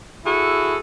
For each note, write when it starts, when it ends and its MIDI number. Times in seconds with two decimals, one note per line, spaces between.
0.25 0.76 64
0.25 0.76 66
0.25 0.76 68
0.25 0.76 69